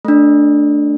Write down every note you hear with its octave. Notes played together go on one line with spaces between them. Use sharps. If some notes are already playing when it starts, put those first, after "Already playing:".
A3 D4